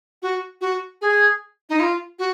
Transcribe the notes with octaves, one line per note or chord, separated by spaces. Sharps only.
F#4
F#4
G#4
D#4
F4
F#4